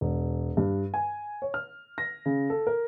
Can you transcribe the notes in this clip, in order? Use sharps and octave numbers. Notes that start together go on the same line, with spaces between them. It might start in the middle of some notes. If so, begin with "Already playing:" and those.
E1
G2
G#5
C#5
F6
A#6
C#3
A4
A#4